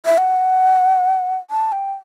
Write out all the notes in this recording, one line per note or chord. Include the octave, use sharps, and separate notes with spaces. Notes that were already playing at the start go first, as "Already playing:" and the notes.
E5
F#5
A5
G5